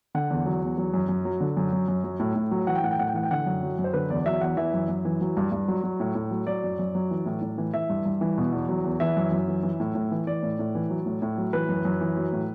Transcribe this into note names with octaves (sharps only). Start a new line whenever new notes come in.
D3 F#5
E2
F#3
E2
F#3
F#2
F#2
F#3
D3
F#2
F#3
F#2
F#3
A2
A2
F#3
E3 F#5
G5
A2 F#5
G5
A2 F#5
G5
E3 F#5
G5
D3 F#5
F#2
F#3
F#2
C5
D3 B4
E2 D5
F#3 E5
E2 F#5
E3 E5
F#2
F#2
E3
F#3
G2
G2
F#3
F#3
A2
A2
F#3
F#3 D5
F#2
F#2
F#3
E3
A2
A2
E3
E3 E5
G2
G2
E3
B2
E2
F#3
E2
E3 E5
F#2
F#2
E3
E3
A2
A2
E3
E3 D5
A2
A2
E3
F#3
A2
A2
F#3
E3 B4
F#2
F#2
E3
F#3
A2